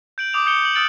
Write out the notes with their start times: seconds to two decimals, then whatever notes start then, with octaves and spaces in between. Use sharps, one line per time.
0.18 G6 D7 F#7
0.33 D6 D#6 F7
0.46 D#6 G6 C#7 G7
0.62 G6 F#7
0.75 D#6 E6 F#6 A6 D7 F#7